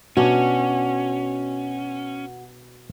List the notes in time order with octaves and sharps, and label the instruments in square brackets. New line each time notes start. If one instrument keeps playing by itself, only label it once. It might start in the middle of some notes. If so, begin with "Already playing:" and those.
[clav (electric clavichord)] B2 D4 [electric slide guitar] C#4 [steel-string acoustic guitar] F#4